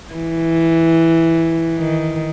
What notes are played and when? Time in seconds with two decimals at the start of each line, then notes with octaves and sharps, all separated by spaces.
0.14 E3
1.79 D#3